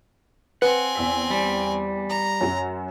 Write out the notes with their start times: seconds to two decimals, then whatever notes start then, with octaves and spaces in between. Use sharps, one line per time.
0.62 C4 B4 F#5 G#5
0.95 E2 E6 B6
1.31 G3
2.09 A#5
2.41 F#2 F#3